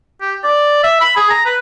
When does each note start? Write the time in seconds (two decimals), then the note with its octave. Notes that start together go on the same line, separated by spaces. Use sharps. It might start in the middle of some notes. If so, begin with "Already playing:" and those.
0.21 G4
0.43 D5
0.84 E5
1.01 B5
1.17 G#4
1.30 A#5
1.46 B4